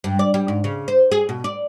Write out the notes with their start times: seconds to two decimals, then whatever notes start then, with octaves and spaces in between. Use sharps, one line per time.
0.04 G2
0.19 D5
0.34 G3
0.48 G#2
0.64 C#3
0.88 C5
1.12 G#4
1.29 B2
1.44 D5